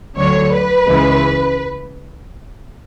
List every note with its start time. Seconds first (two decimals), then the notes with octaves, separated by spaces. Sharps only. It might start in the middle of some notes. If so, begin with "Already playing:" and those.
0.17 D2 D3 F#3 C#5
0.52 B4
0.87 C#2 C#3 E3 G#3